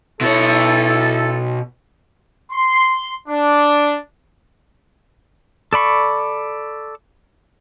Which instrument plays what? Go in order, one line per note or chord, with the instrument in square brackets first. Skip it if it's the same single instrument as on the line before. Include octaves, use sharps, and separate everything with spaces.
[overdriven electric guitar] B2 C#5 [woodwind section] E4 A4
[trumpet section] C6
D4
[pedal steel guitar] A4 D5 B5 C#6